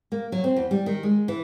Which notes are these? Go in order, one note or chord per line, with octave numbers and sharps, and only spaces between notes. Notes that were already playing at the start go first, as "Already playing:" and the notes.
A#3
F#3
C4
E2
G3
D#3
G#3
E3